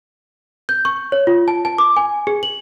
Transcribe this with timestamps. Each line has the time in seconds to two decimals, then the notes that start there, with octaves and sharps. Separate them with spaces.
0.69 G6
0.85 C#6
1.12 C#5
1.27 F4
1.48 A5
1.65 A5
1.78 D6
1.97 G#5
2.27 G#4
2.43 F#7